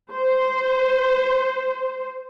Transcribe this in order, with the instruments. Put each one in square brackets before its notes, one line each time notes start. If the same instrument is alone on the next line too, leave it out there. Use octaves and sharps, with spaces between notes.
[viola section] C5